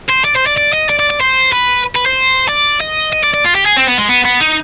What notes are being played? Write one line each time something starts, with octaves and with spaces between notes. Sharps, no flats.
C5
D5
C5
D5
D5
D#5
D5
D5
D5
C5
B4
B4
C5
D5
D#5
D#5
D5
D5
F4
G4
G#4
C4
B3
G#3
B3
B3
D#4